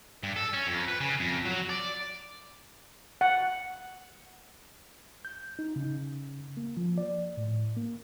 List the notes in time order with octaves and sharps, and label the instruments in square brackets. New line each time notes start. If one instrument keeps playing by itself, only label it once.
[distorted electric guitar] G2
A4
C#4
F2
B4
C#3
F2
F#3
D5
[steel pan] F#5
[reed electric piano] G6
D#4
C#3
A#3
F3
D5
A2
A#3